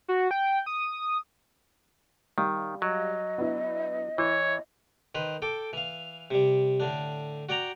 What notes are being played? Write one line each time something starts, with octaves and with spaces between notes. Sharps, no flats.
F#4
G5
D#6
D#3 G3 G4 F5
F#3 D#5
B3 D4 E4
E3 E4 C#5
D#3 B4 C5
A4 G5 D6
E3 F5
C3 G3
A2 D3 D4
F#4 D5 G5 A#5